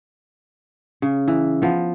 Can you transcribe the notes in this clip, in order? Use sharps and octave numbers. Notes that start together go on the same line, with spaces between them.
C#3
E3
F3 B3